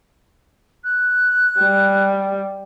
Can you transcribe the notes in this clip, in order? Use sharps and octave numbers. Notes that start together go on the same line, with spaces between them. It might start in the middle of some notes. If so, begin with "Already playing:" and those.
F#6
G3